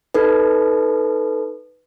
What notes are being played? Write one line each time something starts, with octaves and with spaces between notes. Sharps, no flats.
D#4 A4 B4